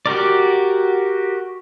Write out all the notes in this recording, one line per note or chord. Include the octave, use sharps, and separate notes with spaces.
F#4 G4 A#4 D5